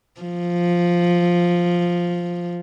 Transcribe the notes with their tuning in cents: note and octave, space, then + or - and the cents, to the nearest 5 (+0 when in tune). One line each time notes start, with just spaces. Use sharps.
F3 +0